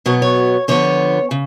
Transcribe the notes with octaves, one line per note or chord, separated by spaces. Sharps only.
B2 F#3 B3 C#5
C#5
D3 F3 B3 C#5
C#3